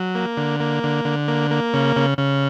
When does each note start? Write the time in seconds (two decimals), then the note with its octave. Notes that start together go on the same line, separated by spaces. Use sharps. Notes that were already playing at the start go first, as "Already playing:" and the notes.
Already playing: F#3
0.15 A#3
0.37 D3
0.60 A#3
0.83 D3
1.05 D3
1.28 A#3
1.51 A#3
1.74 C#3
1.96 C#3
2.18 C#3